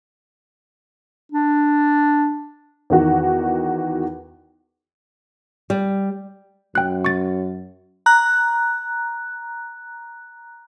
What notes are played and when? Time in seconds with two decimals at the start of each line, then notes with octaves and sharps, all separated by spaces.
1.32 D4
2.90 E2 D#3 F#4
5.70 G3
6.75 F#2 G5 F#6
7.05 C#6 A6
8.06 A#5 F#6